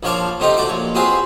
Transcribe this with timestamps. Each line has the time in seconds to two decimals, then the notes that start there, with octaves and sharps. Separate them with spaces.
0.03 A#1 F3 C#5 F5 A5 D6
0.40 C3 A3 D#4 F4 G4 G5
0.57 A3 F#4 D5 D6
0.69 A#1 C#5
0.95 C4 F4 F#4 G#4 B4 C5